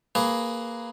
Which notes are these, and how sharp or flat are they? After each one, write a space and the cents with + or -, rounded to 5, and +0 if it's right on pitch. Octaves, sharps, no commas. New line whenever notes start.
A#3 -5 G#4 +0 B4 +5